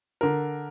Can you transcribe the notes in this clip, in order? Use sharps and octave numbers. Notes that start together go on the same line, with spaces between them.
D3 A#4